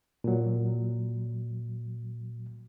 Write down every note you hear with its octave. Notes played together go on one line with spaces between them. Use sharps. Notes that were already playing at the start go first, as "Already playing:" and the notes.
A#2 F#3